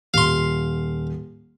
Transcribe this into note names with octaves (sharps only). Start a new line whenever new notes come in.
D#1 F5 C6